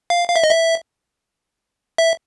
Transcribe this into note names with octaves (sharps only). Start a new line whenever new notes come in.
F5
F5
E5
D#5
E5
E5